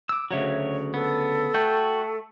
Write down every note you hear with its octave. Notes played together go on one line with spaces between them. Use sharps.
D6 E6
D2 C#3 F#3 F#4 C#5 E5
B3 A4
A3 F#4 G5 G6